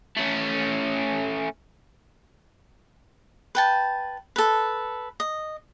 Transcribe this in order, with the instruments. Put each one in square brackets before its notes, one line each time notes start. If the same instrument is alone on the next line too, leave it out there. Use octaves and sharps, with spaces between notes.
[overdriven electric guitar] A3 C#4
[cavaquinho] B4 G5 A5
A4 B4
D#5